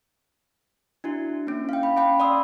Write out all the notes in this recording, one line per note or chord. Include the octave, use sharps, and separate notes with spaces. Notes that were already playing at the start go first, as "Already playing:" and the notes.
D4 E4 F#4
A#3 C#4
F5 G5
B5
C#4 F#5 G5 B5
D5 B5 C6 D#6 E6